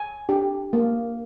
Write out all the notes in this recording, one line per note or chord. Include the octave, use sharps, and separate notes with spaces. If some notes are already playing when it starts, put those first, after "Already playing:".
Already playing: G#5
D4 G4
A#3